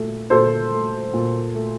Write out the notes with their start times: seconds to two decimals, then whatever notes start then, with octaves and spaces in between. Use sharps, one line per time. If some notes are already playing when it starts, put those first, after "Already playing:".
Already playing: A#2 A3
0.30 A#2 A4 C5
0.73 A3
1.14 A#2
1.54 A3